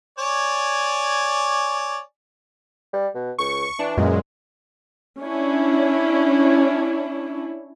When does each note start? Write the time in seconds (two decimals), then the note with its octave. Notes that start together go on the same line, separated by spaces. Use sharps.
0.19 C#5 D5 G#5
2.93 G3
3.15 B2
3.38 C#2 C#6
3.79 E3 D4
3.97 F#2 A#2 G#3
5.21 C#4 D4 E4